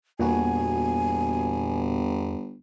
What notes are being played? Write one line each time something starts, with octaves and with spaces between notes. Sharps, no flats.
G1 E2 A#2 F#4 G#5